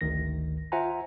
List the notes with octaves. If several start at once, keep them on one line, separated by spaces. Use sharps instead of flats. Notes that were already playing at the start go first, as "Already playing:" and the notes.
G#1 D2 D#3 A#6
F4 C5 E5 F#5 G#5 A#5